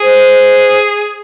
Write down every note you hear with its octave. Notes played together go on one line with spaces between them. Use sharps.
G#4 C5